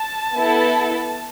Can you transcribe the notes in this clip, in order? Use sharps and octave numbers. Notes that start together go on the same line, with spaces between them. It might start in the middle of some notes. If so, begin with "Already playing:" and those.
Already playing: A5
B3 E4 A4